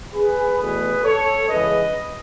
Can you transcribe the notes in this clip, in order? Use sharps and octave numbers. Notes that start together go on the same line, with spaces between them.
G#4 B4
E2 B2 A3 G#4 B4
A4 C#5
C#3 E3 G#3 B4 D#5